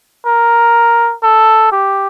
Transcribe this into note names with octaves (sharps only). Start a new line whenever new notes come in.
A#4
A4
G4